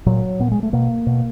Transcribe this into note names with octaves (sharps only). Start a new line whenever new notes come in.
A#2 F#3
A#2 B3
G#3
A3
B2 A#3
B2